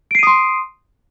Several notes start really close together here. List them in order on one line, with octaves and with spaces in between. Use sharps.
D7 C7 D#7 D#6 C6